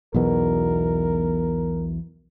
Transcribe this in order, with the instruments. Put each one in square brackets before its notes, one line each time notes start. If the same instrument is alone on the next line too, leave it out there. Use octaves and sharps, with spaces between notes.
[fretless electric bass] B1 E2 B2 [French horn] A#4